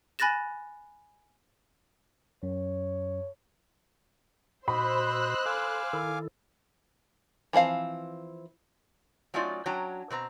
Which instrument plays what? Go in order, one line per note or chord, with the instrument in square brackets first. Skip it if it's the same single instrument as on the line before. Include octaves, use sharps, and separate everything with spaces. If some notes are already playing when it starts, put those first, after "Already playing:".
[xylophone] G#5 B5 F#6 A6 A#6 E7
[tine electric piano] F#2 [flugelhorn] C#5
[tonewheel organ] A#2 F#4 [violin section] C5 E6 F#6 [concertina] D#5 [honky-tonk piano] B5
[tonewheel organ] A4 [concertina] F5 G#5 D6
[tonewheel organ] D#3 E4 A4
[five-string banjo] E3 F3 C4 F5
[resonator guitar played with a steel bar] F#3 A3 C#4 D#4 F4 D5
F#3 C#4 D4 G5 A#5
B2 C4 B4 A#5